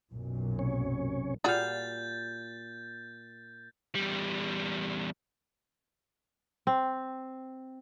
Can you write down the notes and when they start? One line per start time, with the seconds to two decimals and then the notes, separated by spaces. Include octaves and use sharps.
0.12 B1 F#2 A#2
0.59 C3 C#4 C#5
1.44 A#2 G3 F#4 G#4 F5 G6 A6
3.95 E2 G3
6.67 C4